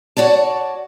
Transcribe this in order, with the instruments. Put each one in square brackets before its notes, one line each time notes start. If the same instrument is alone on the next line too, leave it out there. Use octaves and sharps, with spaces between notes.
[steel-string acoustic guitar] F#4 C#5 D5 A5